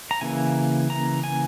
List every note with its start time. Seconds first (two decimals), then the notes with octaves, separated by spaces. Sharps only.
0.11 A#5
0.21 C#3 E3 A#3 G#5
0.90 A#5
1.24 G#5